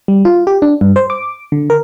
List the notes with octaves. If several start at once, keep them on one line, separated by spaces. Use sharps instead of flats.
G3
F4
G4
D4
G2
C5
D6
D3
A#4